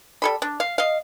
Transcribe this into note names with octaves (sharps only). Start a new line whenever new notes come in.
G3 A4 B5
D4
F5
D#5 F5